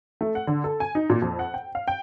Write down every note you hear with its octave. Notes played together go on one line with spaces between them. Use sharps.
A3
F#5
D3
A4
G#5
D#4
A#2
F2
F#5
G5
F5
G5